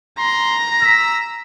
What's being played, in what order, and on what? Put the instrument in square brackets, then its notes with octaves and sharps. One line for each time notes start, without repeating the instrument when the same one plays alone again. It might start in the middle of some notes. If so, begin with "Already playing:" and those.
[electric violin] A#5 [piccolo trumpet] C6
[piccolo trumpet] E6 [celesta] A#6 B6